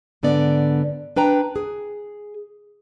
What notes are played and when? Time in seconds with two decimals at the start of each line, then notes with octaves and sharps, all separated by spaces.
0.23 G#2 D3 B3 D5
1.16 D4 B4 G5 A#5
1.56 G#4